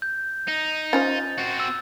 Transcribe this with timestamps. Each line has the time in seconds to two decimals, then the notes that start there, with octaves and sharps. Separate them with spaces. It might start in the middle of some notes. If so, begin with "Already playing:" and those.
0.02 G6
0.48 D#4
0.93 C#4 F4 C5 A6
1.38 C4 F#4
1.60 E6